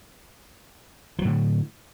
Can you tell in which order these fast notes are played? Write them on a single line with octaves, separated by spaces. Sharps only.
F3 F#3 A2 D3